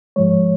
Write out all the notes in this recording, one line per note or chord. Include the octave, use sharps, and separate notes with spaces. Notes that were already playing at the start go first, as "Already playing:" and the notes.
G#2 F3 G#3 C#5